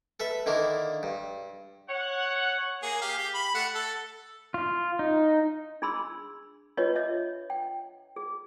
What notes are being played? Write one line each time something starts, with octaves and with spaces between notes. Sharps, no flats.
A4 B4 E5
D3 D#3 A#3 D4 E4
G2
C#5 F#5
A#3 G#4
G4 F5
G4
B5
A3 F#5
A4
F4
D#4
D4 G#4 B5 C6 E6
D4 F4 G4 B4 C#5 D#5
C#5 D#5 E5
G5
G#4